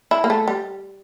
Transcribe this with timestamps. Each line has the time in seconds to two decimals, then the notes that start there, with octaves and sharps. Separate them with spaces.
0.11 E4
0.24 A#3
0.30 A3
0.48 G3